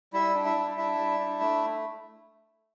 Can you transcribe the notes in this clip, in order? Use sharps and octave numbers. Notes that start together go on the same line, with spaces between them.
G3 E4 E5
D4
E4 E5
G3
D4 E4 E5
G3
D4
A3